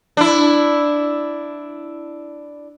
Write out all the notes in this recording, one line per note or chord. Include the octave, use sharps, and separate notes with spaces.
D4 E4